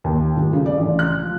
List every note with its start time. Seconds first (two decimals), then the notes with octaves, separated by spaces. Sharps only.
0.04 D#2
0.37 D#1
0.53 C#3
0.66 D5
0.77 A1
0.99 F#6
1.23 F3